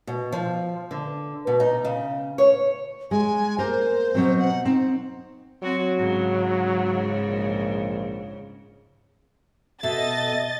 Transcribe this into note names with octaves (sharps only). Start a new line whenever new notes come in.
B2
F3
D3
B2
D#4
C#3
C#5
G#3 G#5
A#3 A#4 C5
B2 F#3 C4
F#5
C4 D#4
F#3 C4 F#4
G#2 C#3
A#1
B2 A4 D#5 E5 A6